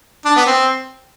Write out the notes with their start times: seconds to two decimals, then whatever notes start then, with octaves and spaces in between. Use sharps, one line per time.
0.25 D4
0.36 B3
0.46 C4